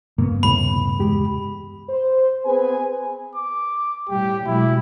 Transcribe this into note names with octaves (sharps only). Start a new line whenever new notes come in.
G2 C#3 A#3 B3
D#2 A2 C3 B5
E2 G#3 G4
C5
B3 C4 G#4 B4 G#5
D6
A2 G3 G4
B2 F#3 G#3 E4